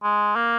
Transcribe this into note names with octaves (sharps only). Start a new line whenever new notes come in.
G#3
A#3